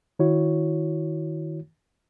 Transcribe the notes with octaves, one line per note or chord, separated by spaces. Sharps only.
D#3 E4 F#4 C#5